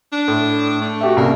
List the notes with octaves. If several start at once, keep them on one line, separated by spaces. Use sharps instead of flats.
D4
A2
A3
F#4 G4 E5
C2 C#3 A#3